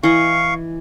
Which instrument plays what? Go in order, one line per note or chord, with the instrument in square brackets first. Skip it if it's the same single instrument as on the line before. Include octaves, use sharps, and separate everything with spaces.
[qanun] E3 D#5 [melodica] F5 C#6